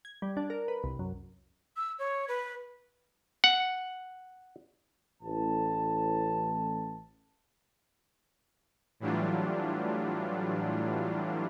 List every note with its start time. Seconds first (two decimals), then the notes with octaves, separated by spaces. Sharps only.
0.05 G#6
0.22 G3
0.37 D4
0.50 A#4
0.68 B4
0.84 C2
0.99 F#2
1.77 E6
1.99 C#5
2.28 B4
3.44 F#5
5.23 A1 A5
9.00 A2 E3 F#3 G3 D4 F4